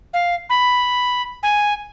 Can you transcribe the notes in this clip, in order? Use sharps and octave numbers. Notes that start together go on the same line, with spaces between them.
F5
B5
G#5